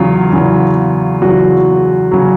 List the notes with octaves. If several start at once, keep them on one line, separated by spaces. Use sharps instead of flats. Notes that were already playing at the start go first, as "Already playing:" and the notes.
Already playing: E2 C#3 F#3 F4
E2 C#3 F#3
E2 C#3 F#3 F#4
C#3 F#3